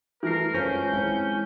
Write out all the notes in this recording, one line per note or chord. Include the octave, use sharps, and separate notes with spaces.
E3 A3 A#4 C7
G#3 C#4 F4 C5 G6
G#3 C4 E4